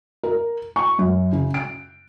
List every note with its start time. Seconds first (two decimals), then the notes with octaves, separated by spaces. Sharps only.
0.23 A#4
0.76 C#6
0.99 F#2
1.33 C#3
1.54 D7